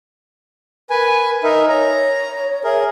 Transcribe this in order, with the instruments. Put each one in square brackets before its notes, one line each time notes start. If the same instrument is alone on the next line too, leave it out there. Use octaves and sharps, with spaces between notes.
[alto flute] A#4 [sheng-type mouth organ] B4 G#5
[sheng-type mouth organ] D#4 A#4 E5
[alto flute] C#5 [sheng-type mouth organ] A#5
[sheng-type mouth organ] G#4 A#4 [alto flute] E5